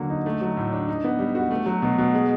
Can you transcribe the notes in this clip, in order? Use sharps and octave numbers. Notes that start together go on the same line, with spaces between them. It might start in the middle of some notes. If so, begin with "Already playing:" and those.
Already playing: D3 F#3 A#3
D#4
A3
F#3
A2
D4
D#4
B3
G3
F#4
A3
F#3
B2
B2
G#3